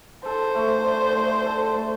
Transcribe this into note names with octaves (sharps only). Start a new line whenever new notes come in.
A4 C5
A3
D4
A3
A4
A3